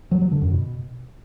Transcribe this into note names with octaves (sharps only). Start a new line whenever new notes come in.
F#3
F#3
D3
F#2
B2